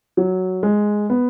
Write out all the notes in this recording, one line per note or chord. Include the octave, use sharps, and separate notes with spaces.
F#3
G#3
B3